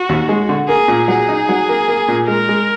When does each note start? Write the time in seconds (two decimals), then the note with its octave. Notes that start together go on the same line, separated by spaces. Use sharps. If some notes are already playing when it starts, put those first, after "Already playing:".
Already playing: F#4
0.09 D#2
0.29 G#3
0.49 D3
0.68 A#3 G#4
0.88 A#2
1.08 F#3 G#4
1.28 D#4
1.49 F#3
1.69 A#3
1.88 A#3
2.08 A#2
2.28 G#3 A#4
2.49 G#3